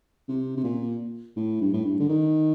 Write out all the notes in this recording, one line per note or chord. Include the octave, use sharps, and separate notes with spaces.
C3
C3
A#2
A2
G2
A2
G2
D3
D#3